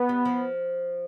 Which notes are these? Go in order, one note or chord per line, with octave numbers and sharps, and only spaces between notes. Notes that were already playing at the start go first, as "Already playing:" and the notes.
Already playing: B3
G3
F3